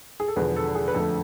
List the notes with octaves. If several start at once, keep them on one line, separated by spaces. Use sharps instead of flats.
G#4
A4
E1 E2 D3 F3 B3 G#4 B4
A4
G#4
B4
F2 D3 F3 A3 A4